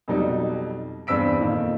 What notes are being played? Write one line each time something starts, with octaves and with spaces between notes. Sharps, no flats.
F2 B2 F#3 G3 D#4
E2 G2 C4 E6 B6 D7
F2 A#2 D#3